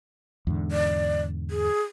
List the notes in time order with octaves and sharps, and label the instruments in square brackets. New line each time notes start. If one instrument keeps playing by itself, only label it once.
[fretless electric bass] E2 G#2 D3
[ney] D5
G#4